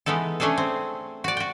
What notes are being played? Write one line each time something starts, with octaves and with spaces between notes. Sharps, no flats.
E3 G#3 B3 D#4 A4
A3 C#4 D4 G#4 A4
C4
F#4 D5
F#4 G5